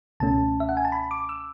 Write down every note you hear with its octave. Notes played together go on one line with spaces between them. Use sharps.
C#2 B2 A3 C#4 A5
E5
F#5
G#5
A5
B5
D6
E6